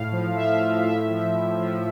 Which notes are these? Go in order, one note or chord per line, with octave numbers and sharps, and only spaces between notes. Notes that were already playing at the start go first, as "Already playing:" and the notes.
Already playing: A2 F5
F3
A2 E5
F3
A2 E5
F3
A2
F3